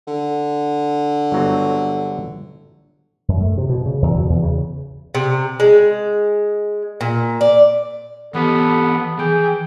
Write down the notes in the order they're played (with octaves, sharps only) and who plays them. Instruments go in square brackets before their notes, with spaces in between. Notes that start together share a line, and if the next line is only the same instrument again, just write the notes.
[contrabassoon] D3
[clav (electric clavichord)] G1 F#3 C4
[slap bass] F#2
A3
C3
B2
C#3
E2
B2
E2
C#3
[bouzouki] C3
G#3
A#2
D5
[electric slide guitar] E3 G4 [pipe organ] B3 [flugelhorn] A4
[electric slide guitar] E3 [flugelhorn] G#4 [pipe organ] G5